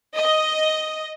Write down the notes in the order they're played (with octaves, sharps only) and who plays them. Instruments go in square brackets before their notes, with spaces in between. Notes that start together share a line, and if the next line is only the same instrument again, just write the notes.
[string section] D#5